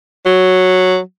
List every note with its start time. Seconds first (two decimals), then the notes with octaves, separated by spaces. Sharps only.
0.26 F#3